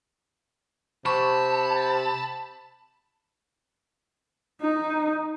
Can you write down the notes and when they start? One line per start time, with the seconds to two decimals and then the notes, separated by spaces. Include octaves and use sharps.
1.06 C3 A5 B5 C#6
4.62 D#4